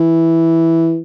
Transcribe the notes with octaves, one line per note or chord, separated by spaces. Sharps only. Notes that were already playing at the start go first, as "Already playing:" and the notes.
Already playing: E3